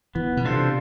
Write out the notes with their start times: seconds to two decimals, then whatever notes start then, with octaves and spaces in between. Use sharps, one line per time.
0.15 E3 B3
0.37 B2
0.45 C3 D4 F4 A4 C5